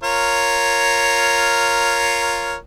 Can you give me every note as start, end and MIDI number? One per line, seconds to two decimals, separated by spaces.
0.03 2.56 65
0.03 2.56 70
0.03 2.56 73